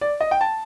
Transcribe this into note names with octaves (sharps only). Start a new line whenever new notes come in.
D5
D#5
G5
A5